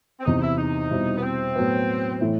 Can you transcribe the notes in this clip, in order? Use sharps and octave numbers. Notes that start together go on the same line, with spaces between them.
C4
E2 C3 E3 D#4
E4
D#4
B2 G3 C4 E4
B3
C4
A2 F#3 B3
A2 E3 A3 E4